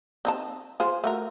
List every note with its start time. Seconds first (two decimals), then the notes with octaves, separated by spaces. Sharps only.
0.25 C4 D#4 A5
0.80 F4 G#4 C5
1.04 A3 F#4 A#4